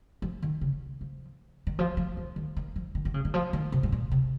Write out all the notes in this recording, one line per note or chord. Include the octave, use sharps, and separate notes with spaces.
F3
D#3
C#3
F3
D#3
F3
F3
D#3
D#3
D#3
F3
D#3
D#3
C#3
D#3
F3
D#3
C3
G#2
A#2
C3